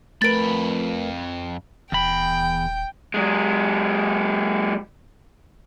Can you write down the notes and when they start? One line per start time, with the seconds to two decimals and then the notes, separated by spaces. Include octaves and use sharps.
0.22 F2 A3 A#4 B4 B5 A6 D7
1.92 D#1 E2 G5 B5
3.14 F#3 G#3